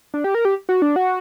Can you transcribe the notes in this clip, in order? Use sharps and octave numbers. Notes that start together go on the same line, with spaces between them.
D4
G4
A#4
G4
F#4
D4
F#4